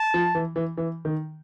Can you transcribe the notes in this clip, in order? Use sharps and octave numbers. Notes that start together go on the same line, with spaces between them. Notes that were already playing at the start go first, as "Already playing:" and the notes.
Already playing: A5
F3
E3
E3
E3
D#3